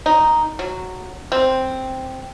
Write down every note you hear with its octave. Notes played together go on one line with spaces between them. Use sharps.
D#4
F#3
C4